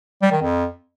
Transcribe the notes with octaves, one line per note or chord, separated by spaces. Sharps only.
G3
D#3
F2